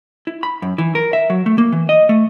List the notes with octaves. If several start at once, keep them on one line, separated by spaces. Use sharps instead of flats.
E4
B5
F#2
E3
A#4
E5
F#3
A3
A#3
E3
D#5
A3